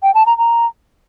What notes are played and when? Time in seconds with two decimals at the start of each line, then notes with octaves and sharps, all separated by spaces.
0.03 G5
0.14 A5
0.26 A#5
0.38 A#5